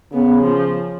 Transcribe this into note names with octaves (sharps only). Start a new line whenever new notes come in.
C#3 B3
F3